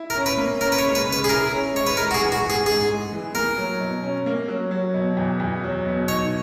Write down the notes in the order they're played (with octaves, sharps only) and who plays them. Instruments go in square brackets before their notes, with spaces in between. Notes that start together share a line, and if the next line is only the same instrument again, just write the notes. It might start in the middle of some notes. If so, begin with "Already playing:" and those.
Already playing: [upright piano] E4
[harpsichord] A#4
[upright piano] C#4
[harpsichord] B4
[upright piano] A#3
[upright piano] C#4 [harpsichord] A#4
[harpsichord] B4
C#5
[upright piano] G#3
[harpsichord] B4
[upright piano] C#3
[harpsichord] B4
G#4
[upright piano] E4 [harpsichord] A#4
[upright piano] C#4
[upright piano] G#3 [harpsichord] C#5
[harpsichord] B4
[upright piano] G#3 [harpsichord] A#4
[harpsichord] F#4
G#4
[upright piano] E3
[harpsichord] F#4
[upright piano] G#2
[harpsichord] G#4
[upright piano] G#2 [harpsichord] G#4
[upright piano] G#3
E3
[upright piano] A#3 [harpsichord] A#4
[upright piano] F#3
B2
C#4
A#3
F#3
F#3
B2
E2
E2
F#3
B2
[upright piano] D#4 [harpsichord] C#5